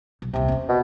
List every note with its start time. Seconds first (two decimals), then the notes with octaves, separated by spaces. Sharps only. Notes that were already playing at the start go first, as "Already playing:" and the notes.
0.22 B1
0.33 D#1 C2 C3
0.48 B3 C#4
0.69 B2